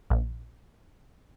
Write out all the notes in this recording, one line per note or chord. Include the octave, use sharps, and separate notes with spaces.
A#1